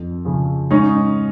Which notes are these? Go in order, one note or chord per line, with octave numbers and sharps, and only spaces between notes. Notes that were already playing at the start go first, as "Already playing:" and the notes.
Already playing: F2
C#3 F3
G#2 C#4 D#4